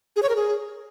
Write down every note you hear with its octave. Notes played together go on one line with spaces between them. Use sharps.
G#4
C#5
A#4
G#4